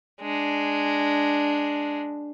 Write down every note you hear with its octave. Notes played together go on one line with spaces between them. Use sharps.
G#3 D4